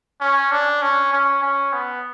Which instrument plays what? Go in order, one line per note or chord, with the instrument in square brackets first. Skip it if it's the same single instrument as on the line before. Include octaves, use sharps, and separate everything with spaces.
[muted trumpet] C#4
D4
C#4
C#4
C#4
B3